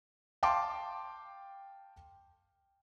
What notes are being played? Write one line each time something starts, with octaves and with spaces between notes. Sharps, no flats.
F5 G5 A5 C6 D6